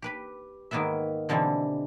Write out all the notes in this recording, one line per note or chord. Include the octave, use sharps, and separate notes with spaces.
G4 B4 B5
G#2 D#3 A#3 B3 B4 E5
B2 D3 E3 G3 C4